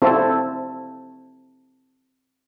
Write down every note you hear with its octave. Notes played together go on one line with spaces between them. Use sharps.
C4 E4 A4